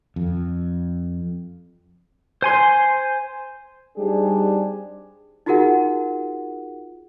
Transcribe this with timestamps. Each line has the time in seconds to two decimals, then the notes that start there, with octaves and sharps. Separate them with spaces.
0.16 F2
2.42 C5 G#5 C6
3.97 G3 C4 D4 D#4 G4 G#4
5.46 D#4 F4 F#4 G#4 A#4 F#5